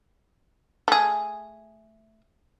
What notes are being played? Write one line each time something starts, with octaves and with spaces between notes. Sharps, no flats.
A3 G#4